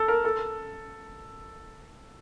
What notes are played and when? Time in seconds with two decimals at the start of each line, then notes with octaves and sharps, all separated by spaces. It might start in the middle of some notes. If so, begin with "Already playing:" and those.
Already playing: A4
0.08 A#4
0.24 A4